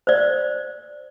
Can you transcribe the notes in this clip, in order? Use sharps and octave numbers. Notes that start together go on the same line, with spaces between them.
C5 D5